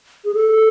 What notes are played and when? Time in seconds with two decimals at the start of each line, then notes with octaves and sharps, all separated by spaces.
0.25 G#4
0.35 A4